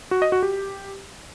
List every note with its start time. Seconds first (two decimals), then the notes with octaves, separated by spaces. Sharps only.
0.11 F#4
0.22 D#5
0.32 F#4
0.43 G4